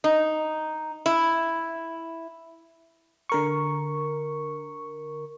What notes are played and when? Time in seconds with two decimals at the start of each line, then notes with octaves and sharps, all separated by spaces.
0.04 D#4
1.06 E4
3.29 D3 A#4 C#6